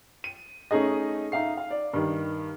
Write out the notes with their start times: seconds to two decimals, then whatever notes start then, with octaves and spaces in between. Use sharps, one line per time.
0.24 D#7
0.71 A3 C#4 D#4 G#4 D#5
1.32 D#4 E5 F5 C7
1.57 F5
1.71 D5
1.93 G2 D#3